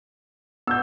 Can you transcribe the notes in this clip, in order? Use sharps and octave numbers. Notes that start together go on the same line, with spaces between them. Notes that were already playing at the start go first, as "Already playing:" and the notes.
B3 E6 G6